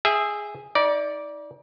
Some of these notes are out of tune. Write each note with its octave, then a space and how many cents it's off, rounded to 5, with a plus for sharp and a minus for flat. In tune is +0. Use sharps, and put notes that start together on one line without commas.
G#4 +0 E5 +0 G5 +40
D#4 +35 D5 -10